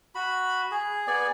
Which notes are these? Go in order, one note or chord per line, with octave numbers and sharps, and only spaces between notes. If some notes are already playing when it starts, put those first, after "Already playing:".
F#4 B5
G#4
B3 G#4 D5 G#5